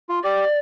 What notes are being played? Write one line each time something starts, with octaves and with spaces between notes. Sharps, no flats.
F4
G4 D5